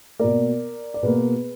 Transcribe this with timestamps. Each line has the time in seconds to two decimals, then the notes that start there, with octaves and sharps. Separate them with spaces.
0.19 B2 A#3 A#4 D5
0.94 D5
1.03 B2 A#3 G#4 B4